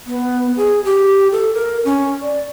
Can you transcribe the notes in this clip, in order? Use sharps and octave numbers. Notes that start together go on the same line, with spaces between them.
B3
G#4
G4
A4
A#4
C#4
D5